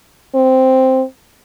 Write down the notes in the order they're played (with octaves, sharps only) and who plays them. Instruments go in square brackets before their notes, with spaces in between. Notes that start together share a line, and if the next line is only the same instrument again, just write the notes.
[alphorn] C4